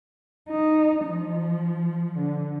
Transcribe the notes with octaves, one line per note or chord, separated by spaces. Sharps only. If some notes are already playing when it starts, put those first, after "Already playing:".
D#4
F3
D3